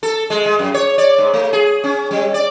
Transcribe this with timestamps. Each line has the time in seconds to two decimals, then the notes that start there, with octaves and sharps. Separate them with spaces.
0.03 A4
0.30 G#3
0.45 G#3
0.59 F#2
0.74 C#5
0.98 D5
1.18 G#2
1.34 A3
1.53 G#4
1.84 C#4
2.11 G3
2.34 D5